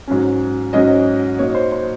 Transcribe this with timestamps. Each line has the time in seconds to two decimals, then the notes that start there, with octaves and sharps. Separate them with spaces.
0.08 G#2 F#3 C#4
0.73 G#2 F#3 C#4 D#5
1.39 A#2 F#3 A#3 D#4 C#5
1.55 C5
1.72 C5